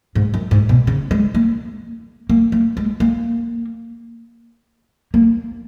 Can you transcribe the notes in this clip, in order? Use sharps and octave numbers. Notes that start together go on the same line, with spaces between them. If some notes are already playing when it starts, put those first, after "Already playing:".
G#2
F#2
G#2
B2
C#3
G#3
A#3
A#3
A#3
G#3
A#3
A#3